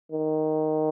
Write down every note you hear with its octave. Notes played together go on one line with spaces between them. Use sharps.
D#3